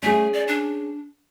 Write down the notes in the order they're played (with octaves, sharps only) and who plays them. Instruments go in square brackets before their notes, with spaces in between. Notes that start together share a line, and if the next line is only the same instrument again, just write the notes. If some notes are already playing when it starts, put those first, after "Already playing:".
[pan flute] A3 [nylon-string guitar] C#4 G#4
[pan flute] D5
D4